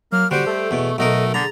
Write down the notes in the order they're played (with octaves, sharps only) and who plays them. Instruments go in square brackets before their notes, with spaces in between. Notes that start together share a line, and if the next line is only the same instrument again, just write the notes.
[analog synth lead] F#3 [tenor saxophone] A#3 [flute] F6
[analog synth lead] D3 [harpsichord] G3 G4 [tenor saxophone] F#4 [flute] C5
[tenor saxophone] A3 [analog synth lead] A4
[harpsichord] E2 B2 [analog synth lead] C#6
[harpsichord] B1 F#4 A#4 [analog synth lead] B2 [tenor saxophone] A3 [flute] D#5
[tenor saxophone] D3 [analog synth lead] G#4 [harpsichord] A#5 [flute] A6